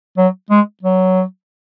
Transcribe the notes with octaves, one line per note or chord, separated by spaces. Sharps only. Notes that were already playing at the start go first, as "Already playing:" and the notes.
F#3
G#3
F#3